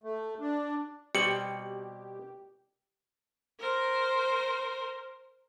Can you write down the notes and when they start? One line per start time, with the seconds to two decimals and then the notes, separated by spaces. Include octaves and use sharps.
0.04 A3
0.40 D4
1.15 B2 G3 C4 G4 C#7 F#7
3.60 A#4 C5